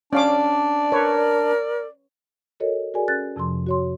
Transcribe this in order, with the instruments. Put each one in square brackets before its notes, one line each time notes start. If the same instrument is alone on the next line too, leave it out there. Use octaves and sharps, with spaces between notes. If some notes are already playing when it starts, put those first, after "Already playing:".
[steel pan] C#4 F5 D6 [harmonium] D4 [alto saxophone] D5
[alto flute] A#4 [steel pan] B4 C#5
[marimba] F#4 A4 A#4 C#5 D#5
F#4 G#4 A#4 D5 G#5
C#4 F#6 A6
F2 C3 F3 C6
F#4 C#5 C6